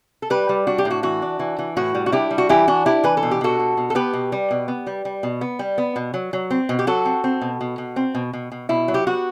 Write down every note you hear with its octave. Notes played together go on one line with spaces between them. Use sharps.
A4
G3 G4 B4
G3
D4 F#4
G4
A2
F#4
E3 F#4
D4
E3
E3
A2 F#4
G3
F#4
D4 E4 G4
G3
F#4
E3 E4 G4
D4 F#4
D4 E4 G4
E3 B4
A4
B2
G4
B2 F#4 A4
B2
B2
A4
B3 G4 B4
B2
G3
B2
B3
G3
G3
B2
B3
G3
B3
B2
F#3
F#3
C4
B2
G4
F#3 F#4 A4
C4
C4
B2
B2
B2
C4
B2
B2
B2
B2 E4
F#3
G4
B3 F#4